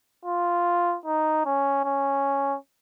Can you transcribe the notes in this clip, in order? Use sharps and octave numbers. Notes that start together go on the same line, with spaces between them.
F4
D#4
C#4
C#4